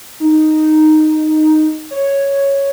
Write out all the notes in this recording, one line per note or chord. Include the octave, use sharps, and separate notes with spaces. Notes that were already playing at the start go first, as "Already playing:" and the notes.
D#4
C#5